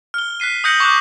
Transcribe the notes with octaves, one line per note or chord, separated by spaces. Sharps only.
F6 G7
F#6 B6 C7 D#7
D#6 F#6 G6 A#6 C#7 F#7
C#6 D6 F#6